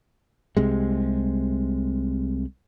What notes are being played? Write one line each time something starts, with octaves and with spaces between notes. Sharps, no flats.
C2 C3 G#3